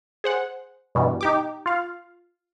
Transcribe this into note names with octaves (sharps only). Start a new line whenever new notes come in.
G#4 C5 F#5
G2 B2 E3 G3
D#4 G4 D6
F4 F5